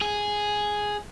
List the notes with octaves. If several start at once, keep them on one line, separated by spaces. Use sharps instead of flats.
G#4